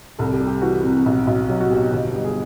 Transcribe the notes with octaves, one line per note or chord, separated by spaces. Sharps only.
C2 A4
G4
G3
G4
E3 F#4
C3
B1
B1
F#3 G4
F#4
B2 G4
G1
G3
G#4